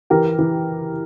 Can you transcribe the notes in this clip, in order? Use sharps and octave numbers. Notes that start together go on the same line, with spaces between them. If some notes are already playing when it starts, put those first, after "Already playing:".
E3 G4 A#4
E3